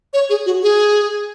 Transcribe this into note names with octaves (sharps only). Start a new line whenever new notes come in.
C#5
G#4
F#4
G#4